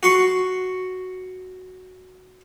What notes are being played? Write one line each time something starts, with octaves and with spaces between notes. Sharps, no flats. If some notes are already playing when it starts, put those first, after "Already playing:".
F#4 C6 C#6